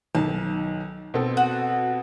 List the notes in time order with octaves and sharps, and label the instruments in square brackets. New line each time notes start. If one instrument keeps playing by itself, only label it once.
[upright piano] B1 D#3 [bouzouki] A5
[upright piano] B2 C4 A4
[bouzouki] F#4